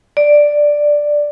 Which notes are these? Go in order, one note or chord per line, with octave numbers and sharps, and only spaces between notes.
D5